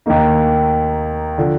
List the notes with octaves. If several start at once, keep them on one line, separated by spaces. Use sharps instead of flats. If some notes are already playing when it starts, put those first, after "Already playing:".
D#2 D#3 A#3 D#4
D3 F3